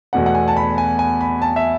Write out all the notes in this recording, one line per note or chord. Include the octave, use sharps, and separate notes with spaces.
E2 B2 A3 F#5
F#5
G#5
A5
B5
G#5
G#5
B5
A5
E5